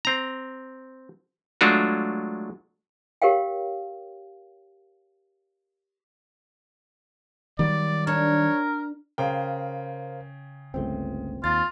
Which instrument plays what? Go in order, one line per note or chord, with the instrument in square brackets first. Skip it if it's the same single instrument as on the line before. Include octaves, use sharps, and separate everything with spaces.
[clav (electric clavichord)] C4 A#5
F#3 G#3 A3 D4 F4 F#4
[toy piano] G4 A#4 C#5 F5 G5
[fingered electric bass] D#3 F#3 G3 [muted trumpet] D5
[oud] D4 [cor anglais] A#4 [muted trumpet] C#5
[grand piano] C#3 G5 [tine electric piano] A#4 C5 F5
[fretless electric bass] G1 C#2 A3 [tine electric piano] C4
[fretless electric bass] D#2 [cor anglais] F4 [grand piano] A6